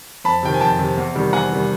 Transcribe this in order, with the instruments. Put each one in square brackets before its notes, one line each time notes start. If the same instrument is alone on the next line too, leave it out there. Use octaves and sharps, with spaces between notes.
[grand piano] F2 A5 B5
C3 D#3 G5
G#5
F2 G5 A5
C3 D#3
E2
C3 D#3 G3
E2 F#5 G#5
C3 D#3 G3